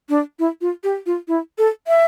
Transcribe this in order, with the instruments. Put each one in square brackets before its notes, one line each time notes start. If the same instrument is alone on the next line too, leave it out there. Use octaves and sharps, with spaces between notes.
[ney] D4
E4
F4
G4
F4
E4
A4
E5